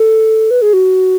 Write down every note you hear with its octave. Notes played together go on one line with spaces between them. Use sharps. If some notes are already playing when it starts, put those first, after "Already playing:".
Already playing: A4
B4
G#4
F#4